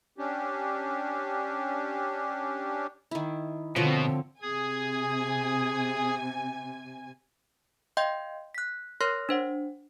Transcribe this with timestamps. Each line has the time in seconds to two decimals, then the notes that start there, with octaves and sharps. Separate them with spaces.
0.18 C#4 D4 G4
3.11 D#3 E4
3.76 B2 D3 F3 C4 C#5
4.42 C3 G#4 G#5 D#6 G#6
7.97 D#5 F5 G5 C6 G6
8.55 F#6 B6
9.01 A#4 C#5 C6 F6 F#6 A#6
9.29 D4 C5 F#5